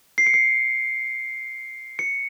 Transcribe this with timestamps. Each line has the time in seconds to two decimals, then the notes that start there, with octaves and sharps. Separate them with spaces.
0.18 C7
0.27 C#7
0.34 C7
1.99 C#7